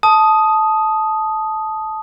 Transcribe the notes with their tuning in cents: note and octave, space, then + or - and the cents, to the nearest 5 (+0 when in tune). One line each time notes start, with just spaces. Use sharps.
A5 -15 D#6 +0